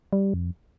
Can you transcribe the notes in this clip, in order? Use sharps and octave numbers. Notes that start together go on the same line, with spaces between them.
G3
F2